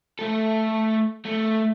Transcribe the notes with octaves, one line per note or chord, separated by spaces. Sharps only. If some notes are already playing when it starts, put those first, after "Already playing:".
A3 A4
A3